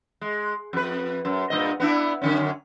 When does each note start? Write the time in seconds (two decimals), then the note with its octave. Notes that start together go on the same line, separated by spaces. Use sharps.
0.21 G#3
0.73 F2 B4
1.25 F#2
1.50 G2 A#2 D#5
1.80 B3 D4 E4
2.22 F#2 D3 C#4